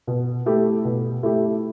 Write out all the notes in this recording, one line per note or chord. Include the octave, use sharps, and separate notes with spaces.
B2
A3 E4 G4
B2
A3 E4 G4